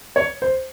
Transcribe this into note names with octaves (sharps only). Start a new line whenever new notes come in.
C#5
C5